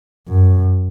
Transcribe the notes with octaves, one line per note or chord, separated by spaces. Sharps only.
F#2